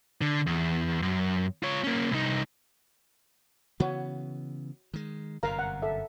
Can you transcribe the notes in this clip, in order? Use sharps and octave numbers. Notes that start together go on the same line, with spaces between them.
D3
E2
F#2
F4 C#5
A#3 C#4
C2 D#4
C#3 E3 B3 F#4 C#5
D#3 G#3
G1 F#2 C3 A#4 F5 A#5
F#5
A4 E5